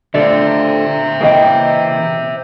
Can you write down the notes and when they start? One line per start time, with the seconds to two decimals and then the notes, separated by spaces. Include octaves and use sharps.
0.15 D3 A3 F4 C5 D5 E5
1.21 C#3 E3 A#3 G#4 D#5 G5